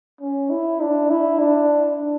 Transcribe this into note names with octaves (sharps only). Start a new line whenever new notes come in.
C#4
E4
D4
E4
D4